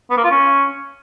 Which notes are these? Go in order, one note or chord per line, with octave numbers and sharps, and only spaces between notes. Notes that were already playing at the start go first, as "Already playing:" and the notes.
B3
A#3
F4
C#4